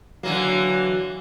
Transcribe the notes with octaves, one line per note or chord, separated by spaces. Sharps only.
D3 E3 F#3 A#3